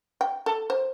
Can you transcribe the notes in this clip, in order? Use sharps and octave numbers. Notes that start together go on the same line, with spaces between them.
G5
A4
C5